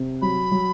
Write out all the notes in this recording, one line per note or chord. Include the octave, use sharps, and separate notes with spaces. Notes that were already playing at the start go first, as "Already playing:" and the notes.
Already playing: C3
F#3 B5
F#3